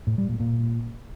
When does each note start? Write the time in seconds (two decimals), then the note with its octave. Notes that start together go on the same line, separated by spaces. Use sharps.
0.07 A2
0.18 G3
0.29 A#2
0.40 A#2